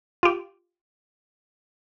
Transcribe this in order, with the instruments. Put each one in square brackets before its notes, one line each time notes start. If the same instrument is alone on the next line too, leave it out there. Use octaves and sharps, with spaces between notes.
[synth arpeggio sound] F4 G4